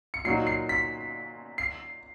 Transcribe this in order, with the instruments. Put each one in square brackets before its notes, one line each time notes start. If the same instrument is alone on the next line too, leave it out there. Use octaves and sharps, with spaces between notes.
[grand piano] C#7
[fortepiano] A#2 F#3 A#3 D#4 F#4 [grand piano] C7
[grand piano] C7
B6
C7